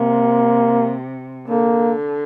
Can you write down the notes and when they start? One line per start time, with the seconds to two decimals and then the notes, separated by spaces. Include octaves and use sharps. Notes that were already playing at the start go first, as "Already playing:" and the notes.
Already playing: C3 A#3
1.48 D3 A#3